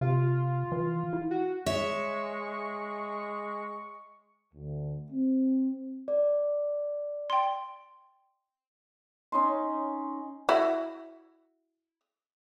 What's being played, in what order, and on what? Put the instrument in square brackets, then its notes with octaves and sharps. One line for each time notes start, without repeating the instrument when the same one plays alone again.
[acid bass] C3 [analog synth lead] F4
[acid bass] E3
E4
[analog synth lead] F#4
[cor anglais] G#3 [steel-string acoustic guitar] C#5 E5 [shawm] C#6
[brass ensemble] D2
C4
[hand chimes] D5
[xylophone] G5 C6
[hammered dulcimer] C#4 D#4 C6
[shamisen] E4 F#4